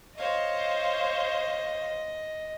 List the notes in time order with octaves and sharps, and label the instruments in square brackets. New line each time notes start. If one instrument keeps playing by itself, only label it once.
[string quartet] C5 C#5 F5 [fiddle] D#5